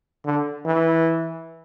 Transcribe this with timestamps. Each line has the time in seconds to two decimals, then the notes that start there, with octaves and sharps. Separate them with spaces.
0.26 D3
0.65 E3